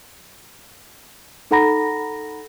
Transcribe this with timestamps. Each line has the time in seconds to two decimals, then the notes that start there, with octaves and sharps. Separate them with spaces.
1.51 D#4 A4 F#5 A#5 B5 A#6